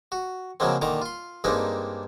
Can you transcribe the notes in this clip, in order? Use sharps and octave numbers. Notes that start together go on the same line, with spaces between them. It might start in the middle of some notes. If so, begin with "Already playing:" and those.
F#4
C#3 F3 F#3 G#3 A#3 C4
A#2 D3 D#3 A#5 D6
F4 C6
G2 G#3 A#3 C4 D4 D#4